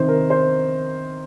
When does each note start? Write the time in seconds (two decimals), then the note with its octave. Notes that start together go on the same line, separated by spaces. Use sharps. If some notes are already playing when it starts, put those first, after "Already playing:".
Already playing: C3 D#3 C5
0.08 A#4
0.30 C5